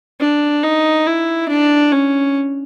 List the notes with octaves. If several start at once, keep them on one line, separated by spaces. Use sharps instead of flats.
D4
D#4
E4
D4
C#4